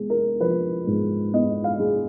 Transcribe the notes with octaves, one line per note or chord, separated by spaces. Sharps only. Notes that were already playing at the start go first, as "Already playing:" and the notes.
Already playing: G#3 B3
A#4
F3 B4
G#2
B3 D#5
F5
G#3